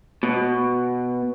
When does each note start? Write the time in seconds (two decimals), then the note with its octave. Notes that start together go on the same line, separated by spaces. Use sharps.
0.23 B2